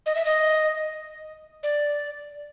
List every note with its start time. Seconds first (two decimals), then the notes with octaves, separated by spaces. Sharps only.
0.06 D#5
0.15 E5
0.25 D#5
1.63 D5